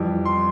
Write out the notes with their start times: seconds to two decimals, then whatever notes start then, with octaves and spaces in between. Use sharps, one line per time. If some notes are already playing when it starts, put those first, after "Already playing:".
Already playing: F2 E3 G3
0.25 C6